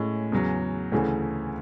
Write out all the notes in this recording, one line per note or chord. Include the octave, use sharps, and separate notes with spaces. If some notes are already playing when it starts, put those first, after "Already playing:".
Already playing: A2 G#3 C#4
E2 C#3 F#3
D2 C#3 E3 A3